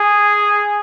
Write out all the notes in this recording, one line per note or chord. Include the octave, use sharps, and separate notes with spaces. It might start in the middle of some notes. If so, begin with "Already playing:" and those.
Already playing: G#4